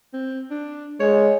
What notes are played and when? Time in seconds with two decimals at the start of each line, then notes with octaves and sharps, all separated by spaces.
0.13 C4
0.50 D4
1.00 G#3 C#5